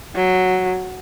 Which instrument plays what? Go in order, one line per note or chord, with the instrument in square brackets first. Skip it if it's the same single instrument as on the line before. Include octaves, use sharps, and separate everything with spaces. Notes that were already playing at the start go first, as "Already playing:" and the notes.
[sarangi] F#3